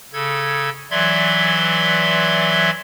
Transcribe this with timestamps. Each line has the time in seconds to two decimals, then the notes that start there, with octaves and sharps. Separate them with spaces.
0.13 C#3 A4 G#6
0.91 E3 F#3 D5 E5 C6 G#6